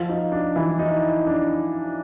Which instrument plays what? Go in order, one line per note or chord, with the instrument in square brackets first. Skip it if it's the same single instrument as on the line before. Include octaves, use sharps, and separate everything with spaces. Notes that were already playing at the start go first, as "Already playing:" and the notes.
Already playing: [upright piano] F3 F4
D#4
D4
E3 E4
D#4
D4